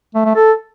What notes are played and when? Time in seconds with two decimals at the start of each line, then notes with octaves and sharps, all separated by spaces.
0.15 A3
0.25 A3
0.36 A4